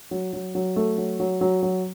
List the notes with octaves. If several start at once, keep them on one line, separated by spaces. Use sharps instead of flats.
F#3
F#3
F#3
A3
F#3
F#3
F#3
F#3